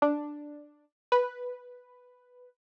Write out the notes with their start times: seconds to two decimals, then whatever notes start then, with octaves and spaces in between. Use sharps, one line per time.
0.02 D4
1.12 B4